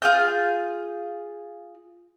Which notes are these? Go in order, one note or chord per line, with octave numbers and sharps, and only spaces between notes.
F4 G#4 G6